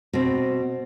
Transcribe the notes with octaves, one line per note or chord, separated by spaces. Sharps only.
B2 C4